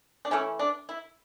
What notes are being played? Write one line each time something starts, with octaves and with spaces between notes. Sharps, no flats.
D4
E3 A3 C#4
D4
E4